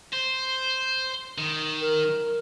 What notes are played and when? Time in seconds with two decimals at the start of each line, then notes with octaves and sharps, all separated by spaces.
0.13 C5
1.38 D#3
1.81 A#4